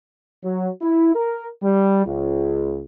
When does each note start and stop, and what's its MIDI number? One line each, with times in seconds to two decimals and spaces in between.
0.43 0.68 54
0.81 1.14 64
1.15 1.47 70
1.62 2.05 55
2.05 2.82 37